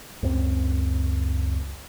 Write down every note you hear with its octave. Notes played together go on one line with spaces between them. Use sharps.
C#2 F#2 C4